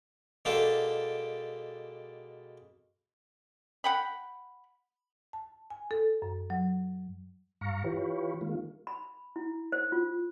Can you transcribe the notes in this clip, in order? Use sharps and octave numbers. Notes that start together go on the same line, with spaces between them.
B2 G#3 A#3 D4 G4 A4
F#5 G5 B5
A5
G#5
A4
F#2
F#3
G2 F5 A#5 C#6
E3 F4 G4 B4 C#5
D#3 G#3 A#3 F4
B5
E4
C5
F4